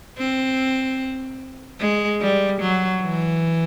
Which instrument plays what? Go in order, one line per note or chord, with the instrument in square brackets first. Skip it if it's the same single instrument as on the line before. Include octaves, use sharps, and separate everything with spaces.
[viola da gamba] C4
G#3
G3
F#3
E3